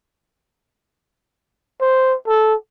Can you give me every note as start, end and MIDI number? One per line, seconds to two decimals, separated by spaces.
1.81 2.15 72
2.27 2.55 69